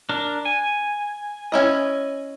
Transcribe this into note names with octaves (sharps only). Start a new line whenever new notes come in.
D4 A#4
G#5
C#4 E4 D#5